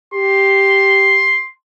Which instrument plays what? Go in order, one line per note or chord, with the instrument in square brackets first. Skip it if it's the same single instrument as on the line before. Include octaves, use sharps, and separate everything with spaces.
[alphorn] G4 [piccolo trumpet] C6